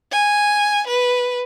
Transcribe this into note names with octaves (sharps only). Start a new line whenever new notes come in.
G#5
B4